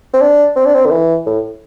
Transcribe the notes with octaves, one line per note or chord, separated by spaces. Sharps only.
C4
D4
C4
D4
C4
D3
E3
A2